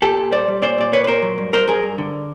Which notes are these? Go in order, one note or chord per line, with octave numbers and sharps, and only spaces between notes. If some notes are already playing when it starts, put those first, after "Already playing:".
A#2 G4 A4
A#2
G3 C5 D5
G3
A#2 C5 D5
A#2 D5
A#3 B4 C#5
B4
A#2 A#4 C5
F#3
G2
G2 A#4 C5
G2 G#4 A#4
G2
D3